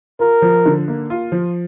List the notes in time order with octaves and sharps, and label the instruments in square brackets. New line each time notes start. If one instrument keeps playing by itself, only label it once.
[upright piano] F4 [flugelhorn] A#4
[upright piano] F3
D3
A#3
F4
F3